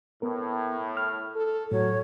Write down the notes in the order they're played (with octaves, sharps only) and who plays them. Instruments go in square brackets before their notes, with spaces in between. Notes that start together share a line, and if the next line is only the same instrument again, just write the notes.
[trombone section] A2 [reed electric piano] B3 A#4
[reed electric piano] F6
[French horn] A4
[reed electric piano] A2 [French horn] F#3 [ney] C#5